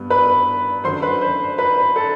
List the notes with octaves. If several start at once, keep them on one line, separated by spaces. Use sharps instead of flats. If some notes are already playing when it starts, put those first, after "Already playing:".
Already playing: G2 B3
B4 B5
F#2 D3 F#3 C5 C6
B4 B5
C5 C6
B4 B5
A4 A5